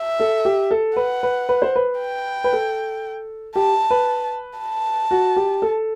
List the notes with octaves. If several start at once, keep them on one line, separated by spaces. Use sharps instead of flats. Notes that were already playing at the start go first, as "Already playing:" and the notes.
Already playing: E5
A4
G4
A4
B4 F#5
B4
B4
C5
B4
G5
B4
A4
G4 A5
B4
A5
F#4
G4
A4